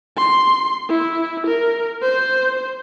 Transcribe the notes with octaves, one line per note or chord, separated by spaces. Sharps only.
C6
E4
A#4
C5